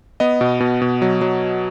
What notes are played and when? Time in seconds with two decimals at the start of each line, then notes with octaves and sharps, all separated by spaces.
0.20 B3 D#5
0.41 B2
0.60 B2
0.82 B2
1.02 F#3
1.21 F#3